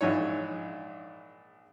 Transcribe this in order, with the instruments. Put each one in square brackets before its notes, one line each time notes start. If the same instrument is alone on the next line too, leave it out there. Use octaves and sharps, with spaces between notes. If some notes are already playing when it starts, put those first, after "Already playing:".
[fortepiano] A#1 G#2 E3 D#4 C#5